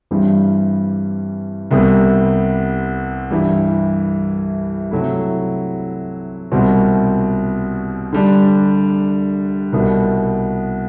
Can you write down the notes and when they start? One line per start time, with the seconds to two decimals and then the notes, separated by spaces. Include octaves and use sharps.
0.11 G2 E3 G3 C4
1.71 C2 C3 G3 B3
3.31 G2 E3 G3
4.91 C3 F#3 A3 E4
6.52 C2 B2 G3 C4 F#4
8.13 D3 G3 D4
9.72 C2 B2 G3 B3